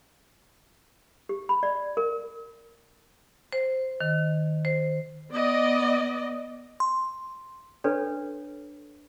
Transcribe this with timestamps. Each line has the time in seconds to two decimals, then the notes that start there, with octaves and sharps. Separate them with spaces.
1.29 G4
1.49 B5
1.63 D5
1.97 A#4
3.53 C5
4.00 D#3
4.65 C5
5.31 B3 D5 D#5
6.80 C6
7.84 D4 A4 B4 C#5